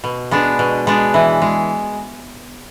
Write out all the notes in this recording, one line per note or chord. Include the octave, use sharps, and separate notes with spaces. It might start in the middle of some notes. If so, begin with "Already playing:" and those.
B2
G#3 B3 D4
B2
G#3 B3 D4
E3
G#3